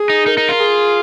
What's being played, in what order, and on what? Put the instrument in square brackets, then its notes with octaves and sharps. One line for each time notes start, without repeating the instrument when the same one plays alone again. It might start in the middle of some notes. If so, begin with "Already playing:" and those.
Already playing: [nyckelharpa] G#4
[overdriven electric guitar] D#4
[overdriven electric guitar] D#4 [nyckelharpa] A#4
[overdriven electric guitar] D#4
F4
[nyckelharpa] G#4